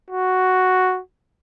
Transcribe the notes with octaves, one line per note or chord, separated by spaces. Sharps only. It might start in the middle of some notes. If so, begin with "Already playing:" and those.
F#4